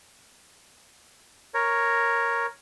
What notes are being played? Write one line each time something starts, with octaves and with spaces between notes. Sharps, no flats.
A#4 C#5